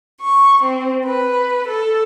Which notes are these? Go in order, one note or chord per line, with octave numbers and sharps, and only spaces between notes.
C#6
C4
B4
A4